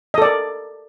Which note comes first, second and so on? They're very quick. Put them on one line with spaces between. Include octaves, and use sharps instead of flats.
D#5 A4 D5 A#4